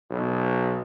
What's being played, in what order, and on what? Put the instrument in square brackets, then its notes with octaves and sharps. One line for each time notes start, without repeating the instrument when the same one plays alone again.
[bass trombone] B1